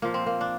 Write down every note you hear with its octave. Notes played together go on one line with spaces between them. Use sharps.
A#2 F3 A#3
C4
A#3
D4